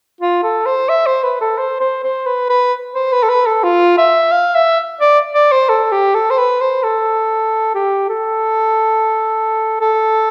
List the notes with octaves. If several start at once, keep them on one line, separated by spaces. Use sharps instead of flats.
F4
A4
C5
E5
C5
B4
A4
C5
C5
C5
B4
B4
C5
B4
A4
B4
A4
F4
E5
F5
E5
D5
D5
C5
A4
G4
A4
C5
B4
C5
A4
G4
A4
A4